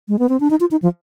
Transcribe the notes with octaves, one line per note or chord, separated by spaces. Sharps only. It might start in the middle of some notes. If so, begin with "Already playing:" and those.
G#3
B3
C4
D4
D#4
F4
D#4
F3